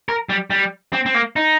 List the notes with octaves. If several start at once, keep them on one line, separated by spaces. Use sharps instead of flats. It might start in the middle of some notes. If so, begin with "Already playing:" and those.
A#4
G3
G3
C4
C4
A#3
D#4